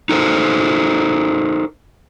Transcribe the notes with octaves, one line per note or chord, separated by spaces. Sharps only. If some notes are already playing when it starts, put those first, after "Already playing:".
D#4 A4 A#4 C5